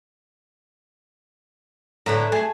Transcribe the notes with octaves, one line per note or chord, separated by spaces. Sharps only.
A2 D3 B4 E5 A#5
A3 G#4